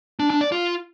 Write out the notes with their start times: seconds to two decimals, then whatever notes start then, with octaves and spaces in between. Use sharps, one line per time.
0.19 D4
0.30 D4
0.41 D5
0.52 F4